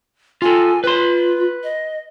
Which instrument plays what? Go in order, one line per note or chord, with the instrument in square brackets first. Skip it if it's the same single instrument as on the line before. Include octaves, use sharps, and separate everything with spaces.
[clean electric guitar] F4 A4 [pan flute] G#5
[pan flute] F4 [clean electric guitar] B4 C6
[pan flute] D#5